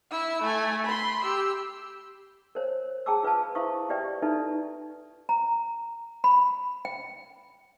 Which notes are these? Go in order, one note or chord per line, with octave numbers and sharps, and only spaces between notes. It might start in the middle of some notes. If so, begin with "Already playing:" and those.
E4 E6
A3 G#5
B5 C6
G4 E6
A#4 C5 C#5
G#4 G5 A5 A#5 D6 E6
F4 B4 F5 A5
E4 C5 E5 F5 C#6 D#6
G4 B4 D5 E5 G5
D#4 E4 A4 B4 D5 E5
A#5
B5
G5